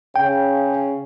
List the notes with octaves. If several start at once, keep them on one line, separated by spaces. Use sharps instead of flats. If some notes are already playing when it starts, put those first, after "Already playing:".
C#3 G5